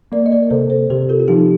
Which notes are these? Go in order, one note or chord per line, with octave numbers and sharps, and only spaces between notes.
A#3 A#4 D5
D#5
A#4 D5
C3 A4 C5
A4 C5
C3 G4 A#4
F4 A4
F4
F3 D#4 G4